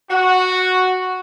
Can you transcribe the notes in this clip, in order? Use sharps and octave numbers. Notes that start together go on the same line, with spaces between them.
F#4